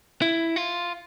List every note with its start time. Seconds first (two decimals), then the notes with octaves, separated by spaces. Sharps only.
0.22 E4
0.56 F4